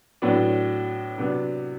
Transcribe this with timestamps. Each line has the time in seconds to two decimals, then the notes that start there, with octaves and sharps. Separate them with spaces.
0.22 A2 F#3 B3 D4
1.18 C3 F#3 B3 D4